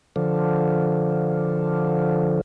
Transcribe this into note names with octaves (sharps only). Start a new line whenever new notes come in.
D3 F3